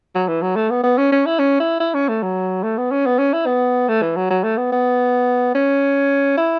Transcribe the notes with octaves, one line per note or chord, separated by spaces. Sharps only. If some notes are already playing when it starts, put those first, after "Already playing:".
F#3
E3
F#3
A3
B3
B3
C#4
C#4
E4
C#4
E4
E4
C#4
A3
F#3
A3
B3
C#4
B3
C#4
E4
B3
A3
E3
F#3
F#3
A3
B3
B3
C#4
E4